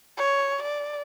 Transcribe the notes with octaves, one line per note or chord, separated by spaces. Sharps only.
C#5
D5